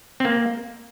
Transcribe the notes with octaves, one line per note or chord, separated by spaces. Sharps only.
C4
A#3